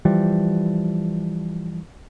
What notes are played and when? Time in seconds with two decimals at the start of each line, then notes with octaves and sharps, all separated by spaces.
0.05 E3 F3 G3